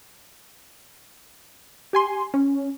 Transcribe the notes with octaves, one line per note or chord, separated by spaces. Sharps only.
G4 G#5 C6
C#4